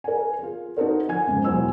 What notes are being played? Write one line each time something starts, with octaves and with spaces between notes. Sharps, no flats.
A#4 G#5
F4 G#4
D#4 F#4 A4 A#4 C5
F3 G#5 G#6
F2 G#2 C#3
E1 F#3 E4 C5 G#5 E6